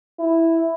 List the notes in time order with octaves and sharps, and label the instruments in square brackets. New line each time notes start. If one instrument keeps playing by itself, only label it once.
[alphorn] E4